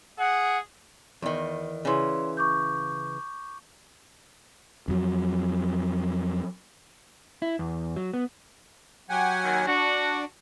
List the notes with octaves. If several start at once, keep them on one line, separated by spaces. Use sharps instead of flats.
G#4 F#5
E2 D#3
C#3 E3 C#5 D5 C6
C#6 D6 G6
F2 F#3
E4
E2
F#3
B3
F#3 G4 F#5 G#5
D#2
D4 F#4